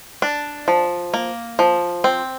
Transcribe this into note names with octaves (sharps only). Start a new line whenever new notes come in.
D4
F3
A#3
F3
C4